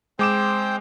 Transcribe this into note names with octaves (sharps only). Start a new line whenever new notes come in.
G#3 C4 C5 G5 D6 E7